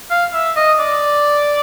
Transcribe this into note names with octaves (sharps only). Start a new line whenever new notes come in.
F5
E5
D#5
D5